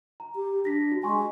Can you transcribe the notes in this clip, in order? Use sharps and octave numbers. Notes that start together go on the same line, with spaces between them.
A#5
G4
D4 A#6 B6
F#4
G#3 G#5 C6 C#6